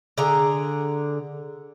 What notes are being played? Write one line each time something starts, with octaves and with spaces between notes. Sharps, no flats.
D3 G#4 A#5